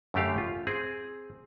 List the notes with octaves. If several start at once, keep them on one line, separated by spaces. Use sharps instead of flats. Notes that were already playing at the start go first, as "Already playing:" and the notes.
F#2 D3 A3 G4 F5
F4
C4 G#4